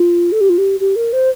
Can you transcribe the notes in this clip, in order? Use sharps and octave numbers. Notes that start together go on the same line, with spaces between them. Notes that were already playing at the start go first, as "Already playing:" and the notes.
Already playing: F4
A4
G4
F4
G4
G4
A#4
C5